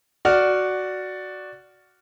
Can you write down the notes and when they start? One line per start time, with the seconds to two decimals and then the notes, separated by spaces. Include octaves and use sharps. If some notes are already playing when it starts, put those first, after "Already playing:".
0.25 F#4 D5 F6